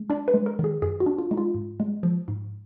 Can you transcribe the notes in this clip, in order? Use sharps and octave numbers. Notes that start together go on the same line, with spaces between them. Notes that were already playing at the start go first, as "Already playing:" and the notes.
Already playing: G#3
D4 D5
B4
G#3
A#4
D#3
G#4
F#2 G#4
F#4
D4
F4
G#3 D#4
F4
G#2
G#3
F3
G#2